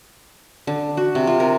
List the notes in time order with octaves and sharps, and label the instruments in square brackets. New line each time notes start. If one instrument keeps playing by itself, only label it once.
[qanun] D3
F#4
C3
F4
A#4